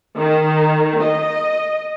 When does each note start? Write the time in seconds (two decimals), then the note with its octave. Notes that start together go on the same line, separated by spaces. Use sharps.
0.16 D#3
1.02 D#5